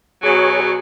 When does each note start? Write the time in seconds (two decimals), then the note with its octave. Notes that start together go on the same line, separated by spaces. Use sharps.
0.23 B2 F#3 G#4 C#5